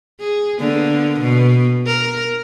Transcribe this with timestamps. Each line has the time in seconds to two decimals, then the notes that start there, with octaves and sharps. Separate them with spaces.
0.20 G#4
0.59 D3 A#3 B3
1.21 B2
1.87 A#4